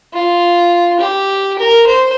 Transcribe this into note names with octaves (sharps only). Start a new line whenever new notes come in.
F4
G4
A#4
C5